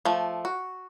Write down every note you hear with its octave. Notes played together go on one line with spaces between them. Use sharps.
F3 A3
F#4